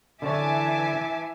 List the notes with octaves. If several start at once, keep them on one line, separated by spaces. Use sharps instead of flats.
D3 E3 C#5 E5 G#5 A5 D6